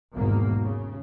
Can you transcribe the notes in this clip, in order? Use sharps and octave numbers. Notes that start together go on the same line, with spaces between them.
G#1 E2 B2 A#3
C#3